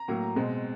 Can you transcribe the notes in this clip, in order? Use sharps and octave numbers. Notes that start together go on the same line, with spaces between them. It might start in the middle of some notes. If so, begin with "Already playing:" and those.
Already playing: A#5
A2 F#3 A#3
B2 G#3 C4